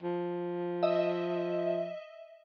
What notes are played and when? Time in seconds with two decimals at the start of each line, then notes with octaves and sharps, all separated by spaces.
0.03 F3
0.83 D#5 E5